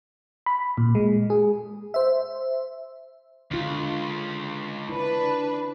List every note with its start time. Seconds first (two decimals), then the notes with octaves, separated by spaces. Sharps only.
0.46 B5
0.77 A#2
0.95 G#3
1.30 G#4
1.94 C5 E5
3.51 C#2 D3 F4
4.89 D4 E4 B4